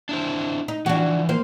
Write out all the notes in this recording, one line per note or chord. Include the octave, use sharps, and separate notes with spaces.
D4 E4 C5
D#4
E3 F3 D4 F#4
A#3 C5